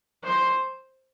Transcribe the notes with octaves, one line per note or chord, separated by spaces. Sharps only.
C5